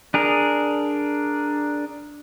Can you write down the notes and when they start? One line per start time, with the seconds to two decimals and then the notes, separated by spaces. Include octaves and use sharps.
0.14 D4 G#4 A#4